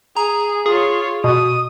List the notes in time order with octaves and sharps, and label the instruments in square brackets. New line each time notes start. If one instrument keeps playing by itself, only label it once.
[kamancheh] G#4 [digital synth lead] A#5
[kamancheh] F4 C#5 [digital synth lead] G#4
[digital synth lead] B2 [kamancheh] D#6